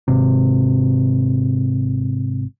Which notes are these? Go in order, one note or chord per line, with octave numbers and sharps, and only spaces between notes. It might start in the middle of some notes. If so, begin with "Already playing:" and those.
G#1 C3